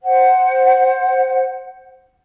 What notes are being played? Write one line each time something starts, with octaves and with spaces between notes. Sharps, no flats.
C5 F#5